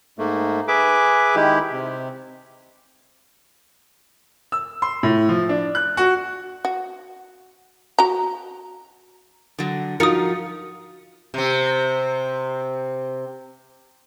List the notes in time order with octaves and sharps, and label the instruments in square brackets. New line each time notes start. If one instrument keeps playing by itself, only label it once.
[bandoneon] G#2 A3 A#3
G#4 B4 E5 D6
D#3 G#3 E4 G4
C3
[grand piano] E6
C6
A2
F3
D4
F#6
F#4
[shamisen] F#4
F#4 A#5
[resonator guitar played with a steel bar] D3 F#3
[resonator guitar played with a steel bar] F3 D#4 F4 [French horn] F#4 [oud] A#4 [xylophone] D#6 C#7
[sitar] C3 C4